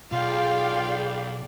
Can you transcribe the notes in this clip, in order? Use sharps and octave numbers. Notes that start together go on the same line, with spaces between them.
B1 F4 G#4 D5 F5 G5